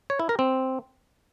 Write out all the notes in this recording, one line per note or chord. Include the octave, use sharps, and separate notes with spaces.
C#5
E4
A#4
C4